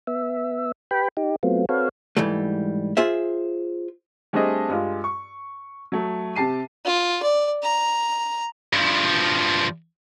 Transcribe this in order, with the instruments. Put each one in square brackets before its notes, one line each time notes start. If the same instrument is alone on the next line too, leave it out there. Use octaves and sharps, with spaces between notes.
[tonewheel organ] B3 E5
G4 B4 G5 B5
D#4 G4
F#3 A3 B3 C4 F4
C4 F#4 A4 B4 C#5 F5
[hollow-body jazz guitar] G#2 E3 G3 A3
F4 G#4 C5 E5
[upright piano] G3 A3 C4 D4 G#4 D#5
G2 G#3 F4
C#6
F#3 A3
C3 G4 A5 C7 D#7
[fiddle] F4
D5
A#5
[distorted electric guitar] G2 F3